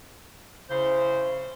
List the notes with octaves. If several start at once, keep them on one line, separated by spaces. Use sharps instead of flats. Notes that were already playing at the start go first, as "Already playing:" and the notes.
C#3 C#4 E4 C5